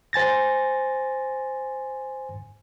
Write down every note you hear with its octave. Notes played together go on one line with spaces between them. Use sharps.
C5 G#5 A6 A#6